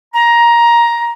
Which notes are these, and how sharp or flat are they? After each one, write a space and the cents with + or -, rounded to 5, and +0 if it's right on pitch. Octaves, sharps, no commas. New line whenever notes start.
A#5 +15